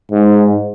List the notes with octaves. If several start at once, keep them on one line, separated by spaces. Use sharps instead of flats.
G#2